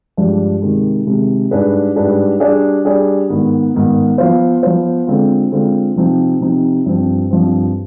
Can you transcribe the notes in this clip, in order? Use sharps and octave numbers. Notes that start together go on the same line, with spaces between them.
G2 F3 G#3 D4 G4
C3 D#3 G#3
C3 D#3 G#3
G#2 G3 D4 G#4 B4
G#2 G3 D4 G#4 B4
G3 D4 G#4 D5
G3 D4 G#4 D5
G#2 D#3 B3
G#2 D#3 B3
F3 B3 F4 C5
F3 B3 F4 C5
D3 G#3 C4 F4
D3 G#3 C4 F4
C3 F3 C4 D#4
C3 F3 C4 D#4
G2 F3 C4
G2 F3 C4